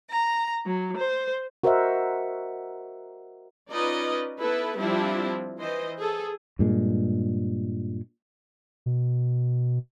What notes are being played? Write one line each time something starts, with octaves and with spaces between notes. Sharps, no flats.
A#5
F#3
C5
F#4 A#4 C5 D#5 E5 F#5
C#4 D#4 F4 B4 D5 D#5
B3 E4 A4 B4
F3 G3 C4 D4 E4 F4
E3 C5 D#5
G#4 A4
G2 A#2 G#3
B2